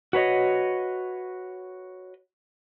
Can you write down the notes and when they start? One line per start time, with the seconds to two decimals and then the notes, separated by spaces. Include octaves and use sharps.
0.13 F#4 B4 C#5 D#5